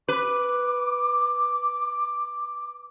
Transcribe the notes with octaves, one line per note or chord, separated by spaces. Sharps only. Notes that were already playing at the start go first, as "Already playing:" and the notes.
B4 D6